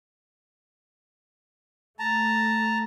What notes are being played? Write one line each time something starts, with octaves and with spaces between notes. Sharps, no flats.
A3 A5 A#5